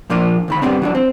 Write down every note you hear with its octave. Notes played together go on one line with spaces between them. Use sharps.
A#2 F3 A#3 D4 F4
D2 D#3 B5
G2 F3 G3 B3 C4 D4
E3 F#3 D4
C4